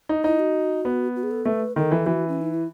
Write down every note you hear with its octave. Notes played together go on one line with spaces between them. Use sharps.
D#4
D#4 E4
F#4
B3
F#4
G#4
A4
A3 B4
D#3 A4
E3
E3 F#4
C#4
D#4
E4